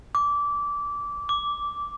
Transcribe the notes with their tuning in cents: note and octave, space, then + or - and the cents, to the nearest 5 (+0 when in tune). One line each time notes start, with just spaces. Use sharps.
D6 -20
D6 -10